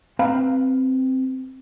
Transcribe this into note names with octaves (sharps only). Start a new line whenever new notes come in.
C4 B4 F5 A#5 B5